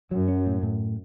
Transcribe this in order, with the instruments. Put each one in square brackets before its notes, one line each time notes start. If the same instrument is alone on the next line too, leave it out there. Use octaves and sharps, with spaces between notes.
[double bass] F#2 [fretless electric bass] F#3
[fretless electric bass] C#4
A2
A2